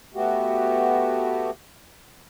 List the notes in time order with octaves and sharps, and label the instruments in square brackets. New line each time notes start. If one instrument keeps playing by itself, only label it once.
[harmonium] A3 B3 F#4 G4